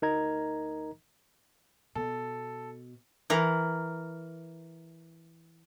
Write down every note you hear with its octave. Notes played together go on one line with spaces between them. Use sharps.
D2 D#4 A#4 D#5 A#5 G#6
B2 A4
E3 A#4